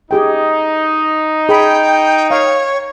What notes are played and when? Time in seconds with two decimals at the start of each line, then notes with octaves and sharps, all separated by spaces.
0.11 D#4 G4 G#4 G5
1.49 G#4 G5 B5
2.31 C#5 F5